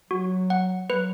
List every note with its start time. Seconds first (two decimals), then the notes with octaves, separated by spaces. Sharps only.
0.10 F#3 F#4
0.50 F#5
0.89 F#3 B4